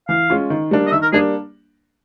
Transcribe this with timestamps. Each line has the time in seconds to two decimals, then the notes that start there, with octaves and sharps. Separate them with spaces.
0.08 E3 F5
0.30 G#3 C#4 F4
0.50 D#3
0.71 G3 A#3 D4
0.87 D#5
0.92 D#3 E5
1.02 A#4
1.13 G3 A#3 D4 G#4